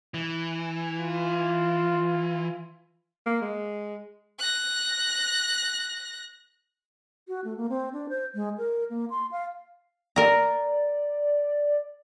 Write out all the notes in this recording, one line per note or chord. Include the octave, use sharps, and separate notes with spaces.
E3
F4
A#3
G#3
F#6 A#6
F#4
A3
A#3
C4
D4
C5
G#3
A#4
A#3
C6
F5
A#4 D5 A#5